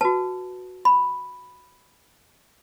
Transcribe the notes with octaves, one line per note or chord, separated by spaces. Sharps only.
F#4 B4 A5
B5